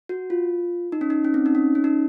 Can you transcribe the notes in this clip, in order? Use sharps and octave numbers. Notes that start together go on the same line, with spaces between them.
F#4
F4
D#4
C#4
D#4
C#4
C4
D#4
C#4
C#4
D#4